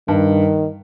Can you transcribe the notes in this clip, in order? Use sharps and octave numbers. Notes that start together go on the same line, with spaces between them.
G2 D#3